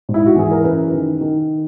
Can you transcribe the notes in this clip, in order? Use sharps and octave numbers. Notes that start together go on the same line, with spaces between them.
G#2
E4
F#4
E3 G#4
A#4
F#2 B4
D#3
D#3